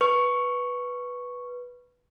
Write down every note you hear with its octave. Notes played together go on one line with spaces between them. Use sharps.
B4 C#6